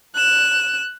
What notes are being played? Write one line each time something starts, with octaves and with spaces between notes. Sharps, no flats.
F#6 E7